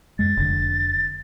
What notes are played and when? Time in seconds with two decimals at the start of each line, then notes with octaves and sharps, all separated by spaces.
0.19 F#2 G#3 A6
0.37 F1 D3